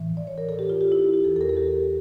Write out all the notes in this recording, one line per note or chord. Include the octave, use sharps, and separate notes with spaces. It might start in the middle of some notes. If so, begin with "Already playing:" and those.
Already playing: A2 E3
D5
C#5
A#4
A4
G4
F4
G4
E4
E4
G4
E2 E3 A4
A4
A#4
A4
G4